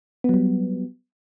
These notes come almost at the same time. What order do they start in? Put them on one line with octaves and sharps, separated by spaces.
B3 F#3 G3